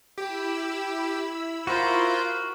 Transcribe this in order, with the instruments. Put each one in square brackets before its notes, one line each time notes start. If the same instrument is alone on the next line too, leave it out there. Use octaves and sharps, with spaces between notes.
[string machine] E4 B5 E6 [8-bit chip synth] G4
[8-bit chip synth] F4 [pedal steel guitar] F#4 A#4 [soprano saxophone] C5